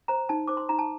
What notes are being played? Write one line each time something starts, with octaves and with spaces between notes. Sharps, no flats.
C5 A#5
D#4 A5
C5 D6
C6
D#4 A#5
A5